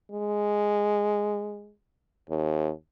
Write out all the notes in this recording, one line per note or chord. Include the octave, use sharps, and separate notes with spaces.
G#3
D#2